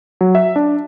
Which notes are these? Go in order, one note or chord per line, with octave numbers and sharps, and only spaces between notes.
F#3
E5
D4